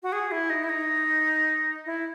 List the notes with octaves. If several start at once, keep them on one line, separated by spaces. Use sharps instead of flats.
F#4
G#4
E4
D#4
E4
D#4
E4